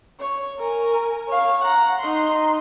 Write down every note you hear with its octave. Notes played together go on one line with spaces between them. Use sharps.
C#5
A#4 G#5
C#5 F5
F#5 A#5
D#4 C6